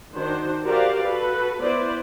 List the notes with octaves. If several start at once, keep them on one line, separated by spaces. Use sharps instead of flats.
D#3 D4 F#4 C5
F#4 G4 A#4 C5 D5 F5
F#4 A4 B4
B3 E4 B4 C5 D5